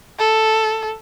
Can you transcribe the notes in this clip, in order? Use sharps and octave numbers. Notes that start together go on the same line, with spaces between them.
A4